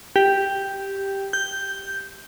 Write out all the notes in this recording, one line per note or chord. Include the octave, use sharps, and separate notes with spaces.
G4
G6